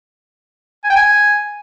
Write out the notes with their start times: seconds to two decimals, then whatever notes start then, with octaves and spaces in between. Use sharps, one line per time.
0.84 G#5
0.90 G5
0.96 G#5